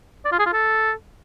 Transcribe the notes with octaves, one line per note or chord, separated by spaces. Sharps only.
D5
F4
G#4
F4
A4